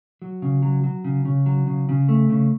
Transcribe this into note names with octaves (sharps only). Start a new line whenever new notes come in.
F#3
C#3
F#3
F#3
C#3
C#3
F#3
C#3
C#3
A3
C#3